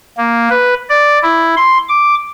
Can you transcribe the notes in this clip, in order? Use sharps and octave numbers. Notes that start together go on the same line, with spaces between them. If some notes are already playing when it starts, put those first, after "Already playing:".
A#3
B4
D5
E4
C6
D6